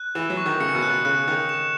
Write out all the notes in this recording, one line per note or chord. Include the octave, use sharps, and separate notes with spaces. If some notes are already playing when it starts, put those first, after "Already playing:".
Already playing: F#6
E3 E7
F#3
C#6
D#3
C#3 C#7
B2
F#6
B2
C#3 F#6
D#3 F#6
E7